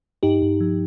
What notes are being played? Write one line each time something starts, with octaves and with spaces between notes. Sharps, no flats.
G2 D#4 G4
G2
F3